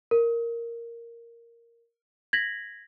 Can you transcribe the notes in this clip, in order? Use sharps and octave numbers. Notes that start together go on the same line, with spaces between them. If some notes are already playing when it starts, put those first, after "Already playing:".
A#4
G#6 A#6 B6 F#7